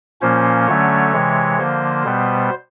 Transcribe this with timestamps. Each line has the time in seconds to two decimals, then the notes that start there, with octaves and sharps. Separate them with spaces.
0.21 A#2 F3 A#3 C#4 C5
0.67 D3 F#3 A3 C#4 C#5
1.13 C3 E3 G#3
1.58 D3 F3 A#3 C5
2.04 B2 G3 B3